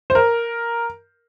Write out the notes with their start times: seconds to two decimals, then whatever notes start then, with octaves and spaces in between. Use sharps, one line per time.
0.10 C5
0.15 A#4